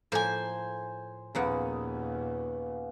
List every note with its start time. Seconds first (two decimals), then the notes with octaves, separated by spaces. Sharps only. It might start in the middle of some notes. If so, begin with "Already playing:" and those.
0.12 A2 F3 A#3 C5 G#5
1.35 D#2 A#2 C#3 F3 A#3 B3 F#5